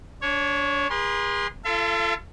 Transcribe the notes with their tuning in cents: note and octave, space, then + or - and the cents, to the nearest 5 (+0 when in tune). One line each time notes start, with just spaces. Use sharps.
D4 -30 C#5 +0
G#4 -30 B4 -45 C6 +0
F4 -30 A4 +10 E5 +45